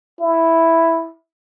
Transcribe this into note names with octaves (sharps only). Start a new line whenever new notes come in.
E4